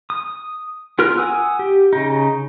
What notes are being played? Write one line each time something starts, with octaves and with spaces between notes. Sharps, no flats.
D#6
B3 F4 A#4 F6 F#6
F#5 G#5 D#6 E6
G4
C#3 D#4